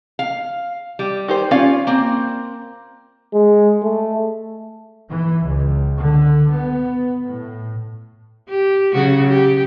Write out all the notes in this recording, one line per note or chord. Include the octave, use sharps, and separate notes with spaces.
F5
G3
D#3 G4 C5
C#4 F4 D5 F5
A#3 C4
G#3
A3
E3
C#2
D3
B3
A2
G4
C#3 F#3 F#4
G4